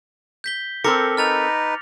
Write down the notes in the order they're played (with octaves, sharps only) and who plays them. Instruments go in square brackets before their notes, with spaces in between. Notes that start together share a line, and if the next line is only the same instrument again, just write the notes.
[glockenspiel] G6 B6 G7
[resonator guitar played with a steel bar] C4 A4 A#4 [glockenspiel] D6 A#6 C#7
[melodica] D#4 B4 [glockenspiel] F6 A6 F7